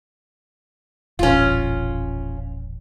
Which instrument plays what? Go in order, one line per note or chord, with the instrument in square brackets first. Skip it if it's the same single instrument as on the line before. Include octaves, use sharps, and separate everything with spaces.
[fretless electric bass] D#1 A1 [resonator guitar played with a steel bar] C#4 F4